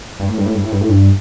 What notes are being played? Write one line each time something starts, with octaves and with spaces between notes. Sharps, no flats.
G2
A2
G2
A2
G2
A2
G2
A2
G2